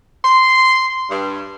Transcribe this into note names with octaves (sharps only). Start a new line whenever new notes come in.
C6
G2